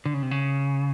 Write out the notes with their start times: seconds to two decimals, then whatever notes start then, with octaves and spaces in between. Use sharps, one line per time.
0.06 D3
0.14 C#3
0.23 C3
0.31 C#3